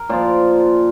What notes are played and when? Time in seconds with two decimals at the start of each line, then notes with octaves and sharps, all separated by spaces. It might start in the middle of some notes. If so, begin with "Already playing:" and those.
Already playing: A#4
0.09 A#2 F3 D5